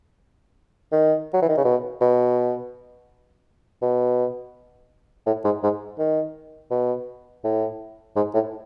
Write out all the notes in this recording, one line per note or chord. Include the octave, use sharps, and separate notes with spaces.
D#3
F#3
E3
D#3
C#3
B2
B2
B2
A2
G#2
G#2
D#3
B2
A2
G#2
A2